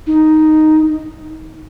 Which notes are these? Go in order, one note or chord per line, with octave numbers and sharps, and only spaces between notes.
D#4